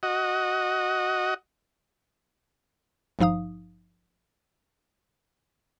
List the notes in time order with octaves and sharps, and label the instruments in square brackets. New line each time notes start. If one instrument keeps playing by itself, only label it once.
[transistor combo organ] F#4 D#5
[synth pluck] G#1 G2 F3 D#4 F5 D#6